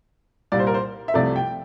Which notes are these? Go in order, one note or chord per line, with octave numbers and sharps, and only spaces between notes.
C2 A#2 G3 D5
C5
A#4
C5
E5
C2 C3 F3 A3 D5
G5